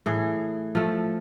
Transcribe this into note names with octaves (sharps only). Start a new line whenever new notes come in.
A2 E3 G#4
F3 A3